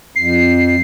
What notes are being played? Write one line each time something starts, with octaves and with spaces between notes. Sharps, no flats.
F2 C7